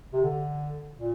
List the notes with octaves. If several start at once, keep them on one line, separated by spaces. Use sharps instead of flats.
C3
D3
A#2